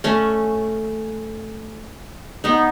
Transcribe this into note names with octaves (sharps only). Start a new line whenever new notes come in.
A3 C#4
B3 D#4